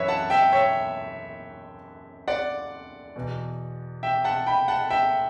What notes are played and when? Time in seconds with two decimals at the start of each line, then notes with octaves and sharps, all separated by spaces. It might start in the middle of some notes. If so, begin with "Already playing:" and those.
Already playing: F#2 E3 B4 C#5 E5
0.08 F#5 A5
0.30 E5 G5
0.52 C#5 E5
2.28 D5 F#5
3.16 E2 B2
4.03 E5 G5
4.24 F#5 A5
4.47 G5 B5
4.68 F#5 A5
4.90 E5 G5